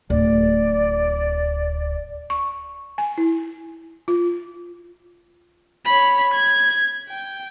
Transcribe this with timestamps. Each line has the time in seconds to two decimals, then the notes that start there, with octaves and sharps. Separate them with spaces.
0.10 D1 D5
2.30 C#6
2.98 G#5
3.18 E4
4.08 F4
5.85 C#5 B5
6.34 G#6
7.09 G5